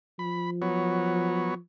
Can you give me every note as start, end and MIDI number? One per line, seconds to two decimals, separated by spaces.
0.19 1.57 53
0.19 0.50 83
0.62 1.54 54
0.62 1.54 59
0.62 1.54 73